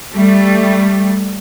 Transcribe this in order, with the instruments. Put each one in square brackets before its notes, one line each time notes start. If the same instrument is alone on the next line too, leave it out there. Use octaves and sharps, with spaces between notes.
[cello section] G3 A3